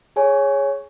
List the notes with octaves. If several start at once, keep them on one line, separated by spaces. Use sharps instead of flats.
G#4 C#5 G#5